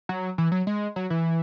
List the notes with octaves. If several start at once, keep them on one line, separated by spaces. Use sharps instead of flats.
F#3
E3
F#3
G#3
F#3
E3